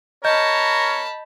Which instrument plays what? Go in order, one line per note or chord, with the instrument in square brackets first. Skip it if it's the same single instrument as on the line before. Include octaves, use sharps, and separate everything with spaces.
[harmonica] A#4 [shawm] C#5 [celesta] D#5 G6 [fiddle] A5 B5